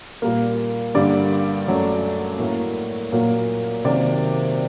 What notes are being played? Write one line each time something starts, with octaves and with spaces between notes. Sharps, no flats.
A#2 G3 A#3
G2 D3 G3 A#3 D5
F#2 F#3 A3
A2 F#3 A#3
A#2 F#3 A#3
C3 D#3 F#3 A#3 D5